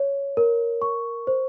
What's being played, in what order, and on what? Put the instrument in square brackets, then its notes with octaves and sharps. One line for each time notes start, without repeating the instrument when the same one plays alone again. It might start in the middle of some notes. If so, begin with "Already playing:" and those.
Already playing: [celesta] C#5
A#4
C#6
C5